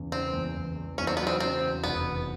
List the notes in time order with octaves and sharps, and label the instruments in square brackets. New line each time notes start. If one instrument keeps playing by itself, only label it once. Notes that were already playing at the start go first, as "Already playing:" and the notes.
Already playing: [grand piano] E2 C#3
[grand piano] C#3 [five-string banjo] C4
[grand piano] E2
E2
E2
[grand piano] E2 [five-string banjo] C#4
[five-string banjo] C4
[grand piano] F#3 [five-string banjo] B3
[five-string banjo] C4
[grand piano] C#3 [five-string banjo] C4
[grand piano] E2
[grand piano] F1 [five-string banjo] B3
[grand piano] E2